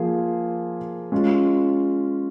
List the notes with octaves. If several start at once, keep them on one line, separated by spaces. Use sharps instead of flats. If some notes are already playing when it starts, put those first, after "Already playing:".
Already playing: F3 A#3 F4 G#4
G#3 C#4 F4